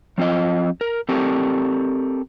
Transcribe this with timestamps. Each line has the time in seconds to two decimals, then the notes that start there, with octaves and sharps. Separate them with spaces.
0.18 F3 C4 F4 D#5
0.81 A#4
1.09 C4 G4 A4 A#4